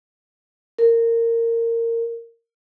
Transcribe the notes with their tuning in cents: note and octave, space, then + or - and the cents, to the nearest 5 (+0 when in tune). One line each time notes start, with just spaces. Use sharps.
A#4 -20